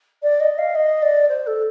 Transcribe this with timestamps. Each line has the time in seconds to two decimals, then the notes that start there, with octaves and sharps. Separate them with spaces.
0.23 D5
0.40 D#5
0.58 F5
0.75 D#5
1.02 D5
1.29 C5
1.47 A4